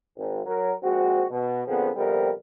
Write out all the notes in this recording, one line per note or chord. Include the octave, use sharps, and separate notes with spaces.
G#1
F#3 A#4
A#1 G#3 C4 F#4
B2
A#2 D3 F3 B3 C4 G#4
A#1 F2 C3 G3 B3 A#4